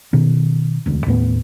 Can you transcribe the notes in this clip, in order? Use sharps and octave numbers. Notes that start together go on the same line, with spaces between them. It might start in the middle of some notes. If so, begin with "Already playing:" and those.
B2 D#3
E1 D2
D#2 A2 B3